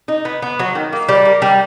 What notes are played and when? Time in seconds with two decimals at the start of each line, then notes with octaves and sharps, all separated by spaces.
0.08 D#4
0.25 B3
0.42 B3
0.59 F#3
0.75 D#3
0.93 A#3
1.09 G3
1.25 A#3
1.42 G3